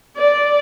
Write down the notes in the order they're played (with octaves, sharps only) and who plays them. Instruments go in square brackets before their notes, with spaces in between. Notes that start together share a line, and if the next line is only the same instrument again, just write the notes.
[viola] D5